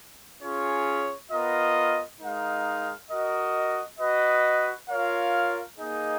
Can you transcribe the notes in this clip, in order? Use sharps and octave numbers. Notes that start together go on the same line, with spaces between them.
C#4 F4 G#4 C#5
B3 F4 A#4 D#5
G#3 D#4 A#4 F5
F#4 A#4 D#5
F#4 B4 D#5
F4 A#4 C#5 F5
A#3 D#4 G#4 D#5